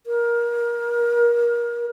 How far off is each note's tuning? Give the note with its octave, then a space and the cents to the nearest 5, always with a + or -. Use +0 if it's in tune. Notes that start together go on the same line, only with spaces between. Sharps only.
A#4 +25